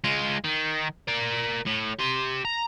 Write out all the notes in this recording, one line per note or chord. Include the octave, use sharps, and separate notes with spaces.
G#3 F4
D#3
A#4 D5
A2
G4 C6
A#5